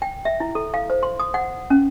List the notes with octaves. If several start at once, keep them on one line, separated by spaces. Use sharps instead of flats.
G5
E5
E4
A4
F5
C5
C6
D#6
F#5
C#4